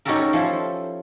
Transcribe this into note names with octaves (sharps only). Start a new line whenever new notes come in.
C#4 D#4 F#4 G4 A4 A#4
F3 C#4 E4 A4